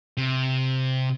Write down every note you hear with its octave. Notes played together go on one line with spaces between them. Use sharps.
C3